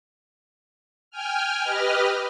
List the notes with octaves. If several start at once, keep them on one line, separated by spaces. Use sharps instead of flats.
G5 G#5 F6
G4 B4 D#5 F6